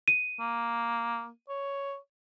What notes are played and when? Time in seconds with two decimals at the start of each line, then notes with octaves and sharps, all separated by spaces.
0.08 D#7
0.40 A#3
1.49 C#5